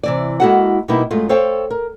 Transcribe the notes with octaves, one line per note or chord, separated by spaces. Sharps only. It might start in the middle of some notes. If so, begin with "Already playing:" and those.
C3 E3 D5
G#3 A#3 E4 F#4 A4 F#5
B2 G3 A#3 B3 D#4 E4
F#2 G#3 A3 F4
A4 C5 C#5 F5 G5
A#4